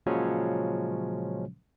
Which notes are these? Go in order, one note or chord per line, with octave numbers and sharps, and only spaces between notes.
A#2 C#3 F3 F#3 G#3 C#4